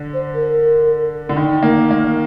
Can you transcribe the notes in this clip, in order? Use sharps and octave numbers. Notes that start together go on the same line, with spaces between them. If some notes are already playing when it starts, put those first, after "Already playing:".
Already playing: D3
C5
A#4
D3
D#3
A#3
A#3